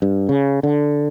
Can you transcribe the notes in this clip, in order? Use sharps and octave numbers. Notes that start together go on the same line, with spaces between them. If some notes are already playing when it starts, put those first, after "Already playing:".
G2
C#3
D3